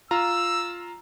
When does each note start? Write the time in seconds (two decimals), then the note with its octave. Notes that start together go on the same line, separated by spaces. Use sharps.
0.11 F4 A#5 E6